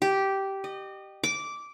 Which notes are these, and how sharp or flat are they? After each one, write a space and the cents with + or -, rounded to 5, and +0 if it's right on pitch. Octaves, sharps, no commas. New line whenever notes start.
G4 -10
D#5 -30
D6 -10